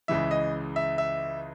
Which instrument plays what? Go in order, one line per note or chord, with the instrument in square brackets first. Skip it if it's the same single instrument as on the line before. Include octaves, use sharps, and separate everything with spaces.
[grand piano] C#2 C#3 E3 E5
D#5
E5
E5